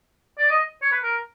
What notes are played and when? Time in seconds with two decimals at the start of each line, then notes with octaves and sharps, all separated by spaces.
0.39 D5
0.50 D#5
0.82 C#5
0.92 B4
1.03 A#4